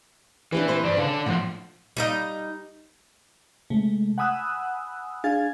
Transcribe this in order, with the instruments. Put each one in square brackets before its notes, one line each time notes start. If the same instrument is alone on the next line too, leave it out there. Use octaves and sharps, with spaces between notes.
[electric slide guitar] E3 [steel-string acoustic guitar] D4 G4 B4
[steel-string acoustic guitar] C4 B4 C5
[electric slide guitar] G2 D4 D5
[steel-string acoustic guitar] C#3 [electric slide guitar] D4 A4
[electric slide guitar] A2 F3 [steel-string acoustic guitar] F#5
[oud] G3 D#4 D#5
[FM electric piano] C3 G#3 A3
F#5 G#5 B5 D#6 E6 F#6
D4 G#4 F5 G#5 G#6 A6